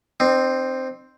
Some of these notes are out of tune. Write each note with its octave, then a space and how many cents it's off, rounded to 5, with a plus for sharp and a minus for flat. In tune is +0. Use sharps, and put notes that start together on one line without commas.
C4 +0 D#4 -40